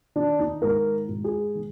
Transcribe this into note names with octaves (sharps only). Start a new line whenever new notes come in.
D#3 D4
D#4
G#2 A#4
G#2
G#4
D#3